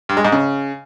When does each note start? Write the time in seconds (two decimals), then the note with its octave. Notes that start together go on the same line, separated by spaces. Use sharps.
0.09 G2
0.17 G#3
0.25 G#2
0.32 C#3